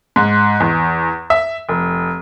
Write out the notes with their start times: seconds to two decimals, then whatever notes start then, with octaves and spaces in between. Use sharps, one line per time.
0.16 G#2
0.60 E2
1.30 E5
1.69 F1